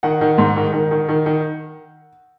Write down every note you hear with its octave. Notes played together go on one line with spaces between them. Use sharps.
D#3 F#5
D#3
G#2
D#3
D#3
D#3
D#3
D#3